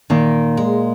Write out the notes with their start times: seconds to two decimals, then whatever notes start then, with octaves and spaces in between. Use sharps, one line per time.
0.10 A#2 D#3
0.57 G#3